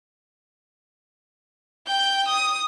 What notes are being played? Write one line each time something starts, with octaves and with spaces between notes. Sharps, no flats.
G5 G6
D#6